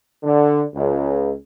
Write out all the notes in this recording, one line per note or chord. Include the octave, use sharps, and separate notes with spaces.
D3
C#2